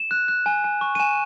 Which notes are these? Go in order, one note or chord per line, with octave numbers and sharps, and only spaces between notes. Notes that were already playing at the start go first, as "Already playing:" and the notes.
Already playing: E7
F#6
F#6
G#5
G#5
C#6
D#7
G#5 E7